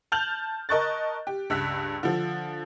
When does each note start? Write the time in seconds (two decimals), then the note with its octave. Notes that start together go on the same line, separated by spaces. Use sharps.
0.12 A5 F6 G6 F7 F#7
0.69 A#4 D#5 A5 C#6 F#6 A6
1.27 G4
1.50 C#2 G2 E6 F#6 B6
2.03 D3 F3